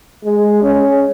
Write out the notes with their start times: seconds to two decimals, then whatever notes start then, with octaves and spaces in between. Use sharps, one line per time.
0.25 G#3
0.63 C#4